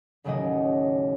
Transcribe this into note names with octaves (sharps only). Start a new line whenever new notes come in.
A1 D#2 C#3 F#3 G4 D#5